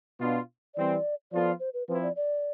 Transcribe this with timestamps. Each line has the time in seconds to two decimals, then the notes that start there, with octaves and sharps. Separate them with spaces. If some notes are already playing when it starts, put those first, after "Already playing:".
0.20 B2 B3 D4 F4
0.75 E3 G3 C4 D5
1.32 F3 B3 F4 A4 D5
1.60 C5
1.74 B4
1.88 F3 C4 E4 B4
2.03 D5
2.16 D5